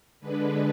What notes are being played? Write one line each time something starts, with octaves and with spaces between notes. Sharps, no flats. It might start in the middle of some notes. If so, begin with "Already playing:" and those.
D3 G#3 D4 B4